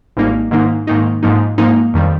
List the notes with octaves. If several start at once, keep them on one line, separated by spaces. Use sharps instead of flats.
G#1 G#2 G3 A#3 D#4
G#2 D#3 A#3 D#4
G#2 D#3 A#3 D#4
G#2 F3 A#3 D#4
G#2 F3 A#3 D#4
F2 D#3 G3